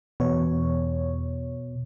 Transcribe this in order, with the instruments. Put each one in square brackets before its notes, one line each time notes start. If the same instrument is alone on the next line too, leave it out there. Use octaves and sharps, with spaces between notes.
[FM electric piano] E2 C#5 [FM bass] B2